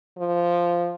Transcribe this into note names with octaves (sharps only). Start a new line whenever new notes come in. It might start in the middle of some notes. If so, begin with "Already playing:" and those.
F3